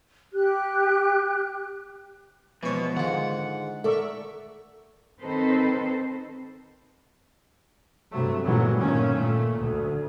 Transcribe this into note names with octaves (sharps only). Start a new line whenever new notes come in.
G4 F#6
B2 E3 F3 G#3 C#5
G#2 D3 D#3 G#3 F4 F#5
A4 A#4 D5 E5 C#6 E6
D#3 C4 D#4 A4 B4 C5
G2 C3 F#3 A3
G1 G2 A#2 E3 F#3 G#3
G2 A#2 D#3 A3 C#4
A#2 A3
D2